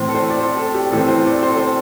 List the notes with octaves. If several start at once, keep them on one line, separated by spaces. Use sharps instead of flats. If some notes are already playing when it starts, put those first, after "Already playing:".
Already playing: A2 E3 C4 C5
A4
C5
D5
C5
A4
G4
A2 E3 C4 A4
C5
D5
C5
A4
C5